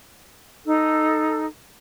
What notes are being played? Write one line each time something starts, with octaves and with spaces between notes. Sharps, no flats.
D#4 A4